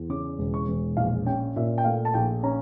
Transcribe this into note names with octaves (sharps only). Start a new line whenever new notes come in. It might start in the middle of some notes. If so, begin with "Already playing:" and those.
Already playing: E2
C#3 D6
E1
C#6
E1
A#1 F5
C#4 G5
A#2 E5
G5
A3 F5
A5
A#1 G5
C#4 A#5